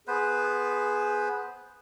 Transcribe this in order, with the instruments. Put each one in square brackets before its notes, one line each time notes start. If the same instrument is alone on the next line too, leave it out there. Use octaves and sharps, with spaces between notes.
[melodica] B3 B4 C5 [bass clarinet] G#4